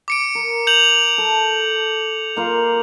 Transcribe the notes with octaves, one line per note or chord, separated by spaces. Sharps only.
D6 C#7 D7
A#4
G6 F7 F#7
A4
A#3 F4 F5